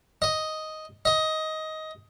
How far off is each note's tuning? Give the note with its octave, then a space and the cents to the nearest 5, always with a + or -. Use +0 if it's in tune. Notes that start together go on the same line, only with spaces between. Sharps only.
D#5 +5
D#5 +15